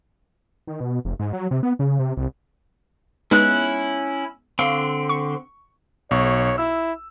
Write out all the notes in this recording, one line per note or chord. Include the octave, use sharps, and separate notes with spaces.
D#3
B2
F1
G#2
F#3
C3
B3
C#3
C3
C2
G#3 B3 C#4 D#4 E4 F#6
D3 C4 F5 C#6
C#6
B1 C#5 C#6
E4 E6